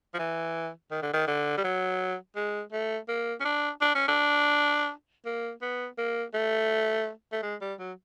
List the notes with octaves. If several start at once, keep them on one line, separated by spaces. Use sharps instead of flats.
F3
E3
D#3
D3
D#3
D3
G3
F#3
G#3
A3
A#3
C#4
D4
D4
C#4
D4
A#3
B3
A#3
A3
A3
G#3
G3
F#3